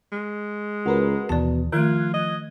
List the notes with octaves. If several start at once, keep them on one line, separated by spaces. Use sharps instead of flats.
G#3
C#2 F#4 A#4 B4
D#2 B2 E3 D5 A5
D#3 F3 A3 F4 F#6 G#6
D#5